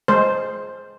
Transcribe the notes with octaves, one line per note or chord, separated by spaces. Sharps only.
G#3 C5